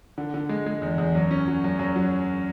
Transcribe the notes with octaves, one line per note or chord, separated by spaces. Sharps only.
D3
D3
G#3
G#3
E2
E2
F#2
C#4
F#3
F#2
F#2
F#3